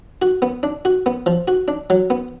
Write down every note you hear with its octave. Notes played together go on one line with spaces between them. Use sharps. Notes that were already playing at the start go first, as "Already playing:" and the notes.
F#4
B3
D4
F#4
B3
F3
F#4
D4
F#3
B3